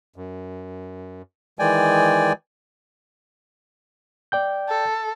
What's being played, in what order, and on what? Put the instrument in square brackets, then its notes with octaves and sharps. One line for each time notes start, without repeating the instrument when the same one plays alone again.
[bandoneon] F#2
D#3 E3 G#3 D5 G5 G#5
[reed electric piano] D5 G5 G6
[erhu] A4